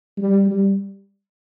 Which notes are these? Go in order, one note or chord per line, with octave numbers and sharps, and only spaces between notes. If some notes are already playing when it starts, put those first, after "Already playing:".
G3
G3